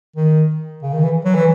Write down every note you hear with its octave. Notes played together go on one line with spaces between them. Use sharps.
D#3
C#3
D#3
E3
F#3
E3